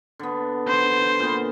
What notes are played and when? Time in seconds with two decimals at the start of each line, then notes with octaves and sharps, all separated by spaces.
0.19 D3 B3
0.68 C5
1.20 A#2 B3